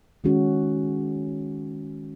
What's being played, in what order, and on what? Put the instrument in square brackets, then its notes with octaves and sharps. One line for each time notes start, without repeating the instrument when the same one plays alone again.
[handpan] D#3 G#3 C#4 F#4